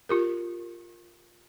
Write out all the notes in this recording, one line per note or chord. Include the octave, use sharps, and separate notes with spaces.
F4 G4 A#4